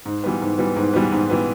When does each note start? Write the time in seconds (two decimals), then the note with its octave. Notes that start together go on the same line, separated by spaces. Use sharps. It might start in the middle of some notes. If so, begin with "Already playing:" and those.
0.05 G#2
0.24 E3 G3 B3
0.41 G#2
0.58 E3 G3 B3
0.76 G#2
0.93 E3 G3 B3
1.12 G#2
1.29 E3 G3 B3